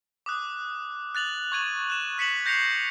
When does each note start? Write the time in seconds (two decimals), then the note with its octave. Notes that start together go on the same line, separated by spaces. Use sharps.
0.26 D6 D#6 F#6
1.15 F#6 A6 F7 F#7
1.52 C#6 G#6 D#7 F#7
1.90 F#6 E7
2.18 F#6 B6 C#7 E7 F#7
2.46 G6 A#6 C7 C#7 F7